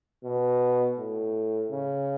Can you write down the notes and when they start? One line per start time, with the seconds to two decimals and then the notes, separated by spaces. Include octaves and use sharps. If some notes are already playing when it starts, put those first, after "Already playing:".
0.24 B2
0.98 A2
1.71 C#3